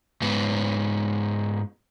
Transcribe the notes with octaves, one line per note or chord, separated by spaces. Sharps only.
G#2 B3